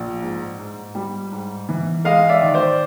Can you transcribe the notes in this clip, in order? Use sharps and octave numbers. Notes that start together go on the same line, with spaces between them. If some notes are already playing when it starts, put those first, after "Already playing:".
Already playing: A#1
G#2
G#2
G3
G#2
E3
G#3 D#5 F5
D5 E5
D#3
C5 D5